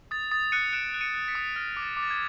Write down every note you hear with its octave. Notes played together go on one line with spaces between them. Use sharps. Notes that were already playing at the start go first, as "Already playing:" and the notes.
D#6 A6
D#6 A6
F#6 C#7 D#7
F#6 D7 E7
F#6
C#7 D#7
F#6
B6 C#7
D#6
F6 A#6
D6
A6
D6
A6
G#6